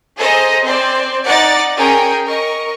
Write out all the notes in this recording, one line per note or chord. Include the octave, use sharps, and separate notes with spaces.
G#4 A4 C5 D#5 A#5
C4 C5 D5
D#4 D5 F#5 A6
C#4 G#4 A#4 G5
A#4 D#5 C#6